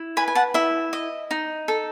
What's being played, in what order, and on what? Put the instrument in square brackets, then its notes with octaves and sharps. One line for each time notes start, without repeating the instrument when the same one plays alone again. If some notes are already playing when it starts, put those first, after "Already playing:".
Already playing: [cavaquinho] E4
B4 G#5 B5
G#5
F#5 A5
E4 E5
D#5
D#4
A4